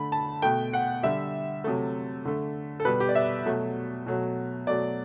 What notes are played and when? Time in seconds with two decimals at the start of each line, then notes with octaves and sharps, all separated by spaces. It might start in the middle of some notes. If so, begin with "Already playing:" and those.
Already playing: D3 A3 B5
0.12 A5
0.42 B2 A3 G5
0.73 F#5
1.03 D3 G3 E5
1.64 C3 F#3 A3
2.25 D3 A3
2.80 A4
2.85 B2 G3 B4
3.00 G4
3.09 D5
3.15 E5
3.45 B2 F#3 A3
4.06 B2 F#3 A3
4.67 B2 F#3 A3 D5